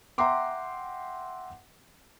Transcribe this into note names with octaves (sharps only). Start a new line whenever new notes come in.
E5 F#5 G5 A#5 C6 D6